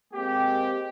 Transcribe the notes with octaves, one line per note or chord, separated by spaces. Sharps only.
G#3 A#3 C4 G4